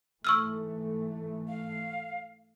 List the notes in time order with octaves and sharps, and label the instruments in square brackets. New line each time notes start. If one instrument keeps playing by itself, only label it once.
[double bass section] G#2 E3 A3 [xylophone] C#6 E6 F6
[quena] F5